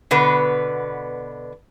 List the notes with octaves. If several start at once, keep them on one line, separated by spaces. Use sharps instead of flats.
B2 D3 B3 B4